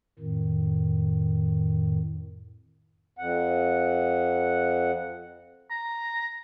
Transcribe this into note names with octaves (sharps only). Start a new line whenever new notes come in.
F2 A2 D#3
F2 F#5
A#5